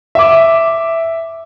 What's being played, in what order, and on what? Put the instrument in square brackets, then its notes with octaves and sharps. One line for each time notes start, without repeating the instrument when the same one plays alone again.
[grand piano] E5 D6